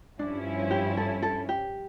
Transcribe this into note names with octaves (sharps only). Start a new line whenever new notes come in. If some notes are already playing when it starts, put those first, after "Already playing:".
G2 F3 C#4 D4 E4
G4
A4
A4
G4